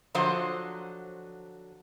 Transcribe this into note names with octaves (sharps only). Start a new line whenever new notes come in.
D3 F3 F#3 C5 D#5